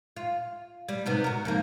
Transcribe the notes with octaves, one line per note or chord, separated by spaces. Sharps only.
F4
G3
G#2 C3 B3
F#4 A#4
F2 G#2 A#3